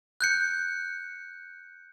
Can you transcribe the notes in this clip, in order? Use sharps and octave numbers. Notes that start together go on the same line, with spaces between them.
F#6 G6 C#7